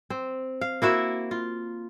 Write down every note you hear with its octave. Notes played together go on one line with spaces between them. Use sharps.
C4
F5
A#3 E4 F#4 E5
F4